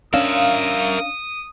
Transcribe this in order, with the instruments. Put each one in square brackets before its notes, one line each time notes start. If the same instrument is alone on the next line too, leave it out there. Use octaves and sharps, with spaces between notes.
[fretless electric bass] C#4 D4 [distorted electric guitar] A#4 E5 [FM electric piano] F5 [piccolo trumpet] D#6